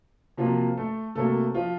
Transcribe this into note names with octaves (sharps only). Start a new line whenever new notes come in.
C3 F3 F#3 A#3 F4
A3 A4
C3 F#3 A3 A#3 A4
F3 F4